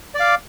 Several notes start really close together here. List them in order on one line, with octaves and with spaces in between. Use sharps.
D5 D6 F5